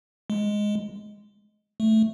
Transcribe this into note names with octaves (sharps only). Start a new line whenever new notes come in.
G#3
A3